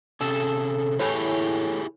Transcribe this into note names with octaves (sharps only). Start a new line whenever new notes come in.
C3 C#4 G#4 A4
A2 E3 E4 G4 G#4 C#5